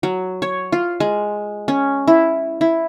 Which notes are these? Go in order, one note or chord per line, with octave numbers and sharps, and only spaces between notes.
F#3
C#5
F4
G#3
C#4
E4
E4